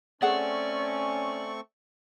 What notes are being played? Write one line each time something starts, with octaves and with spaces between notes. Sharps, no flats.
A3 C4 C#4 G#4 A4 D5 F#5 C#6